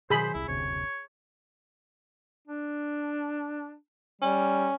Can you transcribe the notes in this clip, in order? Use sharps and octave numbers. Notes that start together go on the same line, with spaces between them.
B2 D#3 F#3 G#4 C5 B5
E1 C2 E4
F#1 D2 C3 C#5
D4
G3 C#4